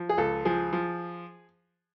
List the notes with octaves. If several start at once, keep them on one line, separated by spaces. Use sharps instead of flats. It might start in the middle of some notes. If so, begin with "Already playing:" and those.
Already playing: F3
G#4
C#2 A4
F3 G#4
F3